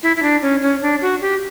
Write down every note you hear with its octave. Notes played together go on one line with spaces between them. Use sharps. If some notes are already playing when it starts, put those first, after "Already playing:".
E4
E4
D4
C#4
C#4
D4
F#4
G4